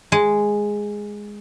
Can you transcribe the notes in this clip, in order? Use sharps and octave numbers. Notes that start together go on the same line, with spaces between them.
G#3